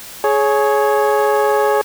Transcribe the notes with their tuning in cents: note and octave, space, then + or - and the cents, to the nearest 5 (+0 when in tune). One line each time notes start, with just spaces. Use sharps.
G#4 +20 C#5 +0